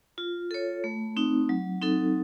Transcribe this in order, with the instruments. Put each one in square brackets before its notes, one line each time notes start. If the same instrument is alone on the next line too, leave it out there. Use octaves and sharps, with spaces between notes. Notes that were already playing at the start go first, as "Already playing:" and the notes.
[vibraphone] F4
A4 C#5
A3
C4 D#4
F#3
C4 D#4 A4